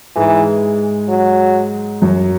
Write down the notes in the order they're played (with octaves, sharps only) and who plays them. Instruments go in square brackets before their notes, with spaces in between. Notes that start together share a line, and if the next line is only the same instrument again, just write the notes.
[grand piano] G#2 G#3 [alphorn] E3
[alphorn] F#3
[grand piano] F#2 F#3